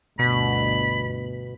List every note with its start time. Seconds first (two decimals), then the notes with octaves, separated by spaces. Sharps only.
0.19 G1 D2 B2 B5